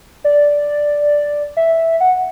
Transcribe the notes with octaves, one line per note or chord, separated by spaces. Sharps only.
D5
E5
F#5